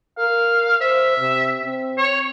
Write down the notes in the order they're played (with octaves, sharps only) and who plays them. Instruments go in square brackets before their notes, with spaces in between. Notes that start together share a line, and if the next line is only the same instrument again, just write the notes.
[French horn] A#4 [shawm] F5
[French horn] C5 [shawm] E5
[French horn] C3
C4
[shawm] C#5